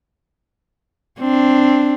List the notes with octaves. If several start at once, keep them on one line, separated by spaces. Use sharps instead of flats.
C4 D4